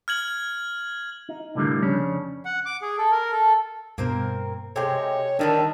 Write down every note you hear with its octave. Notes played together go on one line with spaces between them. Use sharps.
F6 G#6 F#7
D#4
C2 A2 D3 F3 G3 A#3
F2 C#3 C#4 D4
F#5
D6
G#4
A4
A#4
A4
G2 B2 A#3 C4 A#4
C3 G#3 A4 C#5 G5
D3 D#3 G3 A3 D4